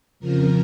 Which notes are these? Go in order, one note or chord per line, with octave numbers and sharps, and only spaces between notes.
F2 C#3 F3 A#4